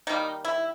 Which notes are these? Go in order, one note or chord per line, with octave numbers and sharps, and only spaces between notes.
D#3 G3 A#3 D#4
E4